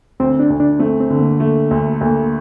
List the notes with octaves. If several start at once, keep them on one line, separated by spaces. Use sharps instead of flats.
D2 C4
D4
D2
D4
A3 C4
C4
D3
A#3
A3 A#3
D2
D2 A#3